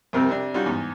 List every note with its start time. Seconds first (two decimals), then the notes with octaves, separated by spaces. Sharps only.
0.13 C2 F2 C3 A#3 C4 A#4
0.29 C3 D4
0.54 G3 C#4 D#4 F4 F#4
0.66 E2 G#2